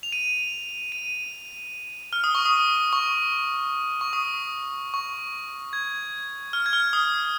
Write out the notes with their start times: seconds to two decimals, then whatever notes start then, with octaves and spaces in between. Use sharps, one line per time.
0.03 F7
0.12 D#7
0.92 D#7
2.13 F6
2.24 D#6
2.35 C#6
2.45 D#6
2.93 C#6
4.01 C#6
4.13 D#6
4.94 C#6
5.73 G#6
6.53 F6
6.66 G#6
6.73 F6
6.93 D#6